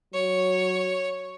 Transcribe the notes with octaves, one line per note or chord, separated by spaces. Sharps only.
F#3 C#5